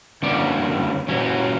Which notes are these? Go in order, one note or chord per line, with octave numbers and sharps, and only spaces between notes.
F#2 D3 A#3 C#4 D5
A#2 F#3 C#4